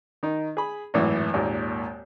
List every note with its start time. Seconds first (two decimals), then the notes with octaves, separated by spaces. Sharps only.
0.23 D#3 D#4
0.57 G#4 B5
0.94 G#1 F#2 A2 E3
1.34 G#1 D#2 A#2